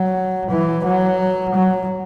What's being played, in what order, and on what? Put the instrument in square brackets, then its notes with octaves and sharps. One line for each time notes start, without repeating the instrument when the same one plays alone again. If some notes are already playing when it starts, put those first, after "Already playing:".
Already playing: [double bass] F#3
E3
F#3
F#3